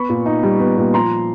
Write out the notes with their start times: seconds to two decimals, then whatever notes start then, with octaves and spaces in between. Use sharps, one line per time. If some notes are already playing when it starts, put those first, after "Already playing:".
Already playing: B3 B5 C#6
0.09 A#2
0.26 D#4
0.43 G3
0.59 B3
0.78 A#2
0.94 F3 A#5 C6